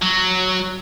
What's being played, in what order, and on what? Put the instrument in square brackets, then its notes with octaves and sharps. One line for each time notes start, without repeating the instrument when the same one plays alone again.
[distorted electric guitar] F#3